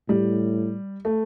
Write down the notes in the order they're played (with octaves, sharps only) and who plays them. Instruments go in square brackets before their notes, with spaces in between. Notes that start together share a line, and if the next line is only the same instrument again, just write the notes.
[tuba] A2 [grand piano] G3
[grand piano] A3